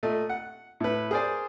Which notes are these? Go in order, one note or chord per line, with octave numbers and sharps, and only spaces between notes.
A#2 A3 D#5
F#5
A2 B4
G#4 A#4 C5 D5 G#5